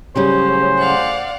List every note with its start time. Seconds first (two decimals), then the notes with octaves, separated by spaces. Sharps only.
0.16 A2 C#3 F#3 G3 C#4 G#4 C5
0.78 D5 F5 F#5